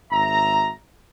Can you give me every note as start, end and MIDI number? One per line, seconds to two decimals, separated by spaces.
0.11 0.71 32
0.11 0.71 76
0.11 0.71 82